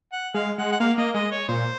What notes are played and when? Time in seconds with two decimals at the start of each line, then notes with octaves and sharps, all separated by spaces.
0.12 F#5
0.34 G#3 F5
0.58 G#3 F#5
0.72 F#5
0.80 A#3 F5
0.98 A#3 D#5
1.14 G#3 D#5
1.32 C#5
1.48 A#2 C5